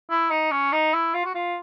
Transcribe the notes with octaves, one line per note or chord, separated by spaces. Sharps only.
E4
D#4
C#4
D#4
E4
F4
F#4
F4